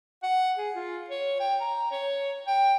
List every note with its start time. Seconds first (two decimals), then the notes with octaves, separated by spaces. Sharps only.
0.23 F#5
0.57 G#4
0.75 F4
1.10 C#5
1.40 G5
1.60 A#5
1.91 C#5
2.47 G5